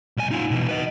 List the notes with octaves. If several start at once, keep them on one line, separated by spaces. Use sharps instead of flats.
B1 G#5
D#4 F4
B2 E3
B4 D#5